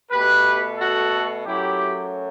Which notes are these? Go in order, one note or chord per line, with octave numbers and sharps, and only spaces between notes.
B2 A3 G4 B4
F#4 A4
F#2 F#3 A3 E4 G4